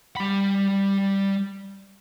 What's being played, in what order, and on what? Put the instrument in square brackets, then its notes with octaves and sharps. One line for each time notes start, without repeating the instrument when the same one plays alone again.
[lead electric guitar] G3 B5